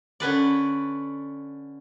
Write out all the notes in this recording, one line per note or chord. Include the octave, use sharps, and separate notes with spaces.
D3 C#4 B4 D5